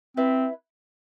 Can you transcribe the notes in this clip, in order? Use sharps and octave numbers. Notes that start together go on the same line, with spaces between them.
C4 E4 B4 E5